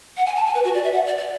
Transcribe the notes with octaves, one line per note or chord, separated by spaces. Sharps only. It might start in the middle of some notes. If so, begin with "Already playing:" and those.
F#5
G#5
A5
G#5
B4
F#4
D5
E5
F#5
D5
D5